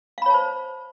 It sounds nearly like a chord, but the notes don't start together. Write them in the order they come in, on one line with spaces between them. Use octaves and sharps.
F5 B5 C#5 A5 C5